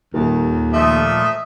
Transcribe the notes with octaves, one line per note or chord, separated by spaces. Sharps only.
D#1 D#2 A#4
A#2 F3 A3 D#5 E5